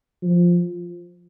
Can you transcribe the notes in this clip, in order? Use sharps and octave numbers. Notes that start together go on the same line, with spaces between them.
F3